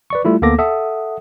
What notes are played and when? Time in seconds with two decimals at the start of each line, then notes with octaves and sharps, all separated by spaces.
0.10 B4 D5 C#6
0.25 G3 A3 E4 F4
0.42 D2 A#3 B3 A4 D6 A#6
0.58 A4 E5 F#5 D#6